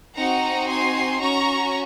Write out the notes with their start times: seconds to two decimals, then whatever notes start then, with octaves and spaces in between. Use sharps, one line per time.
0.15 C4 D#4 F#4 F#5 A#5
0.68 G#5 C6
1.20 C#4 F#4 A#5 C#6